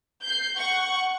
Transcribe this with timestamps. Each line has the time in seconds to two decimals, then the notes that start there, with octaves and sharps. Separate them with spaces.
0.22 G6 C7
0.57 F#5 C#6